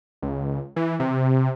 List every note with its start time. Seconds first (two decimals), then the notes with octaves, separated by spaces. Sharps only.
0.22 C#2
0.76 E3
1.00 C3